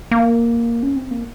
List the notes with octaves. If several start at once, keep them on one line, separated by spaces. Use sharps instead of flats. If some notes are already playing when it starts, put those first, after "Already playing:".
A#3
C#4
C4
A#3